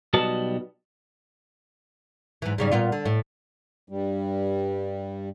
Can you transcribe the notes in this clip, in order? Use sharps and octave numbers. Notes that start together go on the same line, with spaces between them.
B1 G3 F#4 B4 D#5 A5
G#2 E3
G#2 C#3 G3
A#2 B3 F4
D3
A2
G2 G3